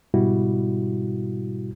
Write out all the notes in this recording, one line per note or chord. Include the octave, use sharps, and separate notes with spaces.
G#2 B2 G3 E4 F#4